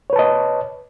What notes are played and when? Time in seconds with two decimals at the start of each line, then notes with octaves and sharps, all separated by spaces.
0.10 C#5
0.13 B4
0.16 A5
0.19 D#5